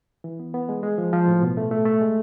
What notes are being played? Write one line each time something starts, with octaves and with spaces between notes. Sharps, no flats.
E3
B3
B3
G#3
G#3
F3
F3
A2
B2
A3
A3
A3
G#3